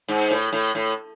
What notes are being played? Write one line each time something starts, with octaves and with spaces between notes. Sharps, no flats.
G#2
A2
A2
A2